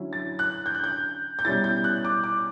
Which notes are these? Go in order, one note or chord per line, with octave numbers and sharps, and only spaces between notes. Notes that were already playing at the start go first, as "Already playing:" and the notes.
Already playing: D3 F#3 C#4 E4
A6
F#6
G6
F#6
G6
G6
B2 G3 C#4 E4 A6
G6
F#6
D6
D6